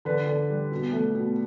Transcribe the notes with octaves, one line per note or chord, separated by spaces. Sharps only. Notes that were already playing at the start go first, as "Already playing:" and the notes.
D3 B4
D3
G3
B2
A3
B2